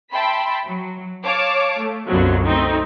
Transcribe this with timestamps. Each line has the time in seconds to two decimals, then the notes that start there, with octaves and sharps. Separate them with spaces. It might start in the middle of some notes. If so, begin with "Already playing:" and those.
0.12 E5 G5 A5 B5 C6 B6
0.66 F#3
1.24 C#5 F5 A5 D6
1.76 A3
2.07 C2 F#2 B2 D3 F3 F#3
2.45 A3 C4 D#4